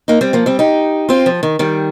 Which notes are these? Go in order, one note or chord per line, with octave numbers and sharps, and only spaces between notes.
A#3 D#4
G3 C4
F3 A#3
G3 C4
D#4 G4
C4 F4
F3
D#3
D#3 G3